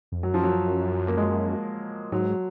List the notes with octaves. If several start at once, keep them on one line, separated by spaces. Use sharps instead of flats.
F2
F#2 F#3
F3
F#3
A#3
G#3
G#2 F#3